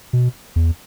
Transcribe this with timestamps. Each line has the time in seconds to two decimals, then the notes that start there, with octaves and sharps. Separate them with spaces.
0.13 B2
0.56 E2